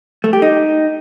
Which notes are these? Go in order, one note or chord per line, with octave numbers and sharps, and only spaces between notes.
A3
G4
D#4